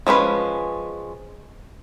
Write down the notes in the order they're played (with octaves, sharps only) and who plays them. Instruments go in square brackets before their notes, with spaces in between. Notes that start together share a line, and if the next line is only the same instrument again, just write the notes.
[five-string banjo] F3 G#3 C#4 B4